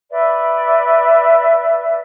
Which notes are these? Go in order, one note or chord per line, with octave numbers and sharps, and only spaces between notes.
B4 D5 E5